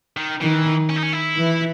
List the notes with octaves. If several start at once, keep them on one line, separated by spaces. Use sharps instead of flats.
D#3
D#3 E3
C#4
D#4
C#4
E4
E3